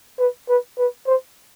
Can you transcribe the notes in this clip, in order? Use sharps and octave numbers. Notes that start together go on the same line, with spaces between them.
B4
B4
B4
C5